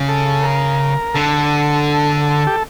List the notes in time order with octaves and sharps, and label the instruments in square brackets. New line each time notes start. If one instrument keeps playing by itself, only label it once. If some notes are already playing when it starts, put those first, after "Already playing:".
Already playing: [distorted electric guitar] C#3
[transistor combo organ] A4
A#4
[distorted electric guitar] D3 [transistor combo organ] A4
[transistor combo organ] G4